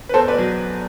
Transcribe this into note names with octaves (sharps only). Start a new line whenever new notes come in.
B4
E2 A4 C5
B4 D5
B2 F#3